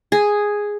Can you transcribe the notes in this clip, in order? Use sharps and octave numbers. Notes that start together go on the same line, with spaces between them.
G#4